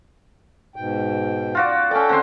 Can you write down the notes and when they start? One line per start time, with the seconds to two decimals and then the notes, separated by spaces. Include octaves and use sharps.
0.76 G#2 B2 G5
1.55 F4 F#4 D5
1.91 C#4 A4 D5 G5
2.09 D3 C4 C6